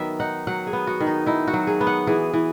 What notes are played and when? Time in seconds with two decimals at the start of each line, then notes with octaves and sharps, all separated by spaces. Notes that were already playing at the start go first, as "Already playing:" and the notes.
Already playing: D#3 F#3 B3 E5
0.20 D#4 F#5
0.47 F#3 F#5
0.67 G#4
0.73 B3
0.87 F#4
1.00 D#3
1.07 D#4
1.26 D#4 E4
1.47 F#4
1.54 F#3
1.67 G#4
1.81 B3
1.87 F#5
2.07 E3 G#4
2.34 E3